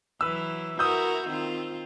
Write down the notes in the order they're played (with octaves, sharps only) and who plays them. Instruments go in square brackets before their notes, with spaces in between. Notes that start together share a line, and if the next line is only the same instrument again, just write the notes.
[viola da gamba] E3 F#3 E4 [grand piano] B4 E6
[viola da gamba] E4 F#4 A#4 [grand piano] D#6 E6 G6
[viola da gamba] D#3 C4 F4